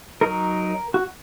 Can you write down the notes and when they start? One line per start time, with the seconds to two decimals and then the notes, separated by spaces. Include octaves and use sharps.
0.21 F#3 D#4 A#4
0.94 F#4